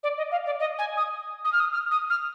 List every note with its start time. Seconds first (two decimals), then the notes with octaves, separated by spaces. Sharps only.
0.03 D5
0.17 D#5
0.31 F5
0.46 D5
0.59 D#5
0.78 G#5
0.97 D#6
1.44 D#6
1.52 F6
1.60 D#6
1.72 F6
1.91 D#6
2.10 F6